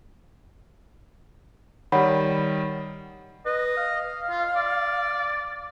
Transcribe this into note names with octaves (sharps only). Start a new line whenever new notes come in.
D#3 G3 C#5 F#5 B5
B4 D#5
F5
F4
D5